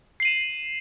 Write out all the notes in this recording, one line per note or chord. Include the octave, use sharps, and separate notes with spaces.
C7 D#7 E7 F#7